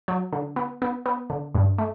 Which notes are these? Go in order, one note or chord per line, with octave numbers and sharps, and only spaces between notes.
F#3
D3
B3
B3
B3
D3
G2
A3